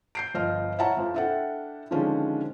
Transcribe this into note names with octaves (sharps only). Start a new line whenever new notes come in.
G6 C7 D7
G1 F3 D#5 F6
E4 C5 C#5 F#5 A5 A#5
F2 F3
D4 E4 A4 E5 F#5 G5
D3 D#3 F3 G#3 C#4 D4